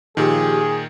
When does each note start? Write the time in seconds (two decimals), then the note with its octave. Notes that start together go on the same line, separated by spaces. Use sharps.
0.17 A#2 D#3 F3 G4 G#4